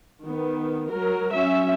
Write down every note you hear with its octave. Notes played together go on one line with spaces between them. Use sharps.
D#3 B3
F#3 A#4
F#3 C#4 E5